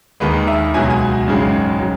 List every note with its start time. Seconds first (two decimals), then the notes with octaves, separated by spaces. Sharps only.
0.20 D#2 D#3 G#3 B4
0.47 E5
0.74 C#2 B2 F#3 G#5
0.90 G#5
1.27 G#1 F#2 C#3 G#3
1.80 F#3